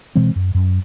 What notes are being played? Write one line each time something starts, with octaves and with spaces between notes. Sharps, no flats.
B2 E3 G#3 C4
F#2
F#2